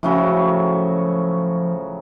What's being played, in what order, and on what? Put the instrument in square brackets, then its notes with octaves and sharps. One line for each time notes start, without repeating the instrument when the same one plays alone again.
[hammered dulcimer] A2 C#3 F#3 [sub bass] F3